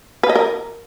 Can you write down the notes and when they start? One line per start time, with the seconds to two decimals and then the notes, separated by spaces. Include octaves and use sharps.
0.23 B4
0.29 D#5
0.35 A#4